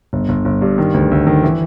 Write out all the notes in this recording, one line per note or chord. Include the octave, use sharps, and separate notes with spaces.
G1
G1
G1
G2
D#3
D2
D2
D#3
E3